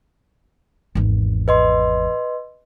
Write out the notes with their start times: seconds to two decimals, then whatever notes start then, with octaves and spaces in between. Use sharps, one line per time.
0.95 G#1 E2
1.48 B4 D#5 C6